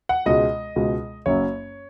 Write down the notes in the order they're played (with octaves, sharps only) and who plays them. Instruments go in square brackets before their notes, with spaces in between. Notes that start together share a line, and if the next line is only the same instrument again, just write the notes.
[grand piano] F#5
C#2 B2 G#3 D#5
C#2 B2 G#3
F#1 F#2 F#3 C#5